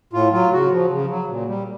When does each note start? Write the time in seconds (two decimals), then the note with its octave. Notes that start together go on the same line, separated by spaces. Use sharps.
0.13 A2 F4
0.32 F#3 F4
0.52 C#3 F#4
0.71 F3
0.90 C#3
1.10 F#3
1.28 A#2
1.48 G3